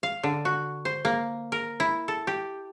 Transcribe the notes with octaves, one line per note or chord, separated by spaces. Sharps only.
F5
D3
F#4
C5
A#3
A#4
E4
A4
G4